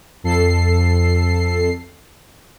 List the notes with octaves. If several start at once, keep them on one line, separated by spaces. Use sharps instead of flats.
F2 A4 C7